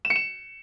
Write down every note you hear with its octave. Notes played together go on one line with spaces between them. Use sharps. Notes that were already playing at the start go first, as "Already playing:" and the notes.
E7
C#7
E7